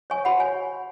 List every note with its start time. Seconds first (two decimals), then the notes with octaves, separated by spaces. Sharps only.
0.10 C#5 G#5 C#6
0.25 F#4 F#5 B5
0.40 C#5 G#5